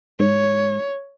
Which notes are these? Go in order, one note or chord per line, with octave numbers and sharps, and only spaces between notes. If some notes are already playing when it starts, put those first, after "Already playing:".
G#2 C#5